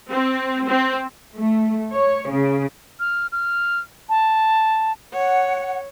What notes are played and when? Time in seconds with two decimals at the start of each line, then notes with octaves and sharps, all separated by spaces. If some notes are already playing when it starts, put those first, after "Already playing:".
0.10 C4
0.67 C4
1.36 A3
1.92 C#5
2.29 C#3
3.00 F6
3.32 F6
4.09 A5
5.14 C#5 F#5